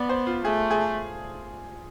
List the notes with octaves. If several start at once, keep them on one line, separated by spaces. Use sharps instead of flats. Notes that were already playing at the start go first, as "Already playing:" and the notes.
Already playing: B3 D5
C5
F4
A3 G#4
G#4